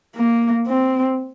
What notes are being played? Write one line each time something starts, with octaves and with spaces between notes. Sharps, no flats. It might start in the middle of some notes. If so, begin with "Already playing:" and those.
A#3
C4